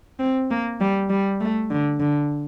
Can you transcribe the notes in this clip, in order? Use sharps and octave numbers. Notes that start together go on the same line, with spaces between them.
C4
A#3
G3
G3
A3
D3
D3